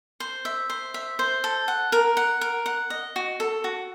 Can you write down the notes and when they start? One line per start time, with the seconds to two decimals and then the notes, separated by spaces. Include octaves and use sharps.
0.20 C5
0.45 E5
0.70 C5
0.94 E5
1.19 C5
1.44 A4
1.68 F#5
1.92 A#4
2.17 F#5
2.41 A#4
2.66 F#5
2.90 D#5
3.16 F#4
3.40 A4
3.64 F#4